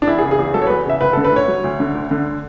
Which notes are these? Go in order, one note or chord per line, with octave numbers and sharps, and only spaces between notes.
D4
E2 E4
G#4
C#3
G#4
E2
F#3 A4
C#5
E2 B4
C#3 E5
D2 B4
D3 A4
B4
D2 C#5
F#3
D2
D3
D2
D3